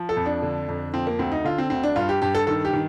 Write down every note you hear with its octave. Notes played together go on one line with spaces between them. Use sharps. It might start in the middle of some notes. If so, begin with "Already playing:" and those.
Already playing: F3
A4
F2
D4
D3
F2
F3 C4
A#3
D2 C4
D#4
D3 F4
C4
D2 C4
D4
G2 F4
G4
G2 G4
A4
D#3 A4
G4
D#3